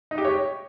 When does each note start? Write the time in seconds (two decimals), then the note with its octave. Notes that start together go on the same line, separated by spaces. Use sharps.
0.11 D#4
0.18 G4
0.25 C#5